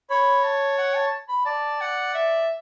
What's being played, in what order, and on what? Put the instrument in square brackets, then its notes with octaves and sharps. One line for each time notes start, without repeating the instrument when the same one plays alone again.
[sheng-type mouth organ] C#5 [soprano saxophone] B5
[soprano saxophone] A5
F#5
A5
B5
[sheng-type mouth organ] D5 [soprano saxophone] A5
[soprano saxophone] F#5
E5